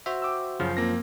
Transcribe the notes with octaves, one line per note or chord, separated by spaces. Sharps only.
F#4 C5 E5
G5 D6 E6
F#2 C#3 F3
A#3 C4 A#6